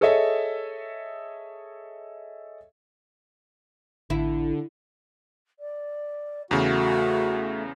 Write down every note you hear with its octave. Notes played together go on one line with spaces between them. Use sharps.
G#4 A4 C#5 D#5 E5
A1 D3 E4
D5
E2 C#3 A3 F#4